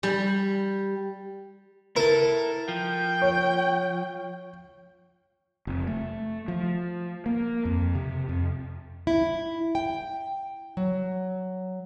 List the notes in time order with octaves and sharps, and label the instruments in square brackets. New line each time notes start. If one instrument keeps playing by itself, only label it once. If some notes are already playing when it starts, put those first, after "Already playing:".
[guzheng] G3
[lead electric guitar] E4 A4 [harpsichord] A#4
[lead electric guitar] F3 [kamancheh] G5
[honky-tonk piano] C#5
[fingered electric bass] F1
A3
F3
A#3
F2
C3
F2
[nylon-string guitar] E4
G5
F#3